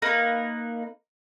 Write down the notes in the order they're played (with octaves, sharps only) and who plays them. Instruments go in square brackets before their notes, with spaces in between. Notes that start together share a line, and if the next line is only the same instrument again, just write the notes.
[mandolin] A#3 D#4 A#4 B4